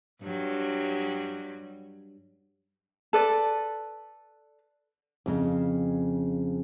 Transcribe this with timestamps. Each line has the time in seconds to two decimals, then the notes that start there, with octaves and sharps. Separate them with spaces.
0.22 G2 F#3 G3
3.13 A4 B4 D5
5.26 F2 C#3